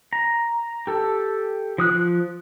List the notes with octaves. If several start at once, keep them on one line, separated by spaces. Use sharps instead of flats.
A#5
G4 A4
F3 D#6 F#6